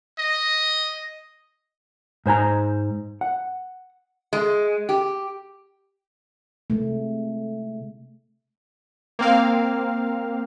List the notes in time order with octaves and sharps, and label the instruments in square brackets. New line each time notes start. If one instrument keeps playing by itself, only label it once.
[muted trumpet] D#5
[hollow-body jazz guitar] G#2 C5 G#5 A#5
F#5
[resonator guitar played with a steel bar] G#3
G4
[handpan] C3 G#3 A3
[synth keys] A#3 C4 F5